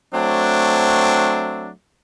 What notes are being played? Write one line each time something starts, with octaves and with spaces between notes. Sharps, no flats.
F#3 A3 C4 D4